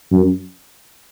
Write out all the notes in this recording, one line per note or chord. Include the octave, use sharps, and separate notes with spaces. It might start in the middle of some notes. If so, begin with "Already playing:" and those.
F#2